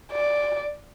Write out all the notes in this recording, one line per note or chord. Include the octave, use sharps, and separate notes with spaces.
D5